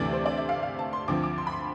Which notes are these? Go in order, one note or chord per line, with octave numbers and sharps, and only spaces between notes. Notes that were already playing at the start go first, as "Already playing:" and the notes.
Already playing: D2 C3 E3 A3 D5
C5
D5
E5
F5
F5
A5
C6
D2 D3 F3 C4 D6
D6
C6
B5
C6